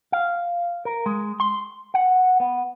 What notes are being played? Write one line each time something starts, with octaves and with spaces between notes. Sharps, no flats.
F5
A#4
G#3
C6
F#5
B3